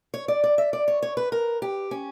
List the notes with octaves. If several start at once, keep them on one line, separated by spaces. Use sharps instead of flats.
C#5
D5
D5
E5
D5
C#5
C#5
B4
A#4
G4
C#4